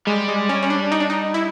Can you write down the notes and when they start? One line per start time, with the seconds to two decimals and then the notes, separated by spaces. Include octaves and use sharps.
0.07 G3 G#3
0.28 G#3
0.49 C#4
0.63 C#4
0.70 D4
0.92 D#4
1.00 D4
1.10 D#4
1.34 E4